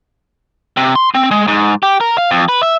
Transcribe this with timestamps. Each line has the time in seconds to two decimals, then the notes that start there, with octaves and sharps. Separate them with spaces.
0.77 C3
0.96 C6
1.15 C4
1.31 G#3
1.48 G#2
1.83 G4
2.01 A#4
2.18 F5
2.31 F2
2.49 B4
2.63 E5